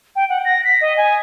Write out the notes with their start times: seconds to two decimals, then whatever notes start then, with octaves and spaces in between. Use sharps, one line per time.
0.16 G5
0.29 F#5
0.45 A#6
0.65 B6
0.81 D#5
0.97 G#5